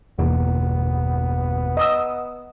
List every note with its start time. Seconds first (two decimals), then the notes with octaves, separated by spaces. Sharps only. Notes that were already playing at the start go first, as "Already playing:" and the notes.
0.19 G1 E2 B2 A#3 B3
1.77 D#5 D#6 E6